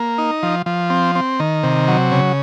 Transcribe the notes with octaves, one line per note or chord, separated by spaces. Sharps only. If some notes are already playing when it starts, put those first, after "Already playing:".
Already playing: A#3
D#4
F3
F3
C4
C4
D#3
C3
F#3
C#3